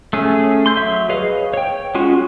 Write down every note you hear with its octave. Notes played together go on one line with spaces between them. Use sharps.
A3 C#4 G#4
C6 G6
F#3 E5
G#4 B4 C#5 D#5 F5
C#5 G5
G#3 C#4 F4 F#4